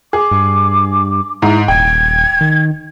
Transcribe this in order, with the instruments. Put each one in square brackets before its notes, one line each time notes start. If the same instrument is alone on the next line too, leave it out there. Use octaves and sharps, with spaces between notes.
[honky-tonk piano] G#4 [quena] D6
[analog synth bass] G2
[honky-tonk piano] G#2 [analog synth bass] E4 [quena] A#5
[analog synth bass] D#1 [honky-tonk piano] G5 [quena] G#6
[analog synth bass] D#3